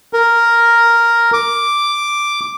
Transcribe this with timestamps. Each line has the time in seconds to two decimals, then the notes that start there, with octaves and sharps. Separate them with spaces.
0.13 A#4
1.33 D6